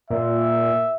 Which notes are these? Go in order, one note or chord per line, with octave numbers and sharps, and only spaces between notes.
A#2 E5